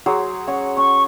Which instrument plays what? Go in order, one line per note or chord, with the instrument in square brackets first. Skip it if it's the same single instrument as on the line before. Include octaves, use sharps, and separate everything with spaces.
[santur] F#3 G#4 C5
C#4 C#5 F#5
[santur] C#4 [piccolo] C#6